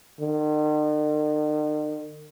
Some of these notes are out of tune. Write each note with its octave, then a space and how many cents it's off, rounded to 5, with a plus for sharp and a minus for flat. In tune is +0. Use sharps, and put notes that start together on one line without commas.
D#3 -45